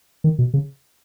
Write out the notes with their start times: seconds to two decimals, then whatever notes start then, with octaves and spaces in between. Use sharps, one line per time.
0.24 D#3
0.39 B2
0.54 C#3